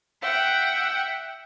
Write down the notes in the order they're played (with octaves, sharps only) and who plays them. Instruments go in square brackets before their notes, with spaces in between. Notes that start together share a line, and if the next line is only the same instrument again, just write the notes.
[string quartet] E5 F#5 G5